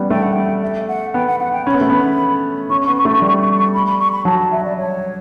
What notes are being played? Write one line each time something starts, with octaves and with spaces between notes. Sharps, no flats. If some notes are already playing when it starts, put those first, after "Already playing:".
Already playing: G3 B3 C#4
A3 G5
F#5
G5
E5
F#5
B3 G5
F#5
F#5
G5
C#4 B5
B3
A3
B3
C#4 C#6
C#6
B3
C#6
A3
C#6
G3
C#6
C#6
C#6
B5
B5
C#6
B5
F#3 A5
A5
E5
D5
C#5